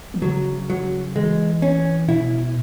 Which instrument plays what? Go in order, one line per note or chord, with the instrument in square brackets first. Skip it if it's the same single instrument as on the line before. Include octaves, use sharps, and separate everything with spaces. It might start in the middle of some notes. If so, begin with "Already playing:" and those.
[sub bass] E3
[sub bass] C#3 [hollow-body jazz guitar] F#3
[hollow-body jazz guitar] F#3
[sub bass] E3 [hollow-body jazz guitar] G#3
[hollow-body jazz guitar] C#4
[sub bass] B2 [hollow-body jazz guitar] E4